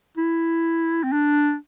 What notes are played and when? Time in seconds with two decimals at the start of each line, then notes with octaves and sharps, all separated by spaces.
0.17 E4
1.04 C4
1.12 D4